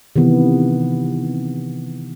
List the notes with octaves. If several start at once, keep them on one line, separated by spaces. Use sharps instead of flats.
C3 D#3 E3 B3